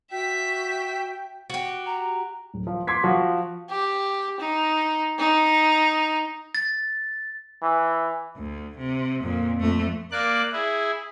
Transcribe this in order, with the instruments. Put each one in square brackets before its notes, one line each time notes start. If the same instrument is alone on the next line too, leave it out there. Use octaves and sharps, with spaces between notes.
[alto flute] F#4 [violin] E5 B6 [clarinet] G5
[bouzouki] F#4 G4
[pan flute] A#5
[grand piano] D1
F3
C6 D6 G#6 B6
F3 F#4
[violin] G4
D#4
D#4
[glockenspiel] A6
[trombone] E3
[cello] D2
C3
F2 A#2
F2 A3
[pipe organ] A#3 D5 F#6
E4 G#4